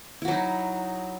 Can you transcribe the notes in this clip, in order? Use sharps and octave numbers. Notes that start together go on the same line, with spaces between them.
F#3 D#4 E4 F#4